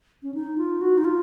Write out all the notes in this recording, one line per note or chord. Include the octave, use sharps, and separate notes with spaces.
C#4
D#4
F4
F#4
D#4
F4